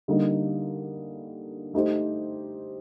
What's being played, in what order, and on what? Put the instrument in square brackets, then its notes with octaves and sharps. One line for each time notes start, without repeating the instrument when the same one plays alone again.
[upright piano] D3 G3 A#3 D#4
A3 D#4 G4 C5